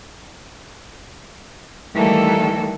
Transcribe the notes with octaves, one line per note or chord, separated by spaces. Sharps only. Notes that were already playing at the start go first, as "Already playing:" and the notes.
D#3 E3 G3 A3 A#3 A4